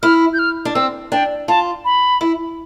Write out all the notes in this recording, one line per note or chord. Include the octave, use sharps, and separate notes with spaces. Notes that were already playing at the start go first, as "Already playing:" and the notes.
E4 F6
G6
F6
D4
C4 E6
D4 G5
F4 A5
B5
E4